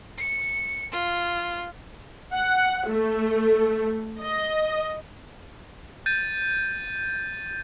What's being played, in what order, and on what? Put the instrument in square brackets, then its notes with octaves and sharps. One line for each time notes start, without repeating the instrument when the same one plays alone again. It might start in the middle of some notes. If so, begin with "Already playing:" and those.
[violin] C#7
F4
[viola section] F#5
A3
D#5
[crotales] G6 A6 D#7